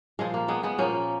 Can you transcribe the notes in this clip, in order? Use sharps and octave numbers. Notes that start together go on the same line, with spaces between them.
A#2 F3 G#3
A#3
G#3 B3
G#3 B3
A#2 F3 A#3 C#4